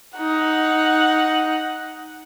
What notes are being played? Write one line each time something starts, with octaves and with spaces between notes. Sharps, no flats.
D#4 F#5